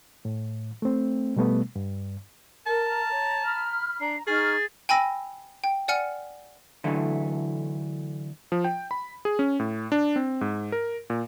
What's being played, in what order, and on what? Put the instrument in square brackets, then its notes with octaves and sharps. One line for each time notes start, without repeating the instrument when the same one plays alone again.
[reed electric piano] A2
A3 C4
B2 G3 A3 B3
G2
[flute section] A#4 [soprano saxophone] A5
[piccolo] A#5
[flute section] C#5
B5 F6
[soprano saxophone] D4 [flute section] A#5 [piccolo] C7
[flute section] D#4 C#6 F6 [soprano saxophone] G#4 [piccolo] A6
[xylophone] G5 G#5 B5 E6 A#6
G5
D5 F#5 G#5 F6 C#7
[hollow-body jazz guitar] D3 E3 F#3 A3
[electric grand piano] F3
G5
B5
G#4
C#4
A2
D4
C4
G#2
A#4
A#2